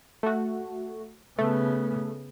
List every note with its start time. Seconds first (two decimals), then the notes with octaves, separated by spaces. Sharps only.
0.23 A3 F#4
1.38 C#3 A3 B3